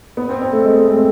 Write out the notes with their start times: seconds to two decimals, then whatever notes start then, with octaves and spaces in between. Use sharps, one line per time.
0.17 B3
0.29 C4
0.41 C4
0.53 A3
0.65 G#3
0.77 A3
0.89 C4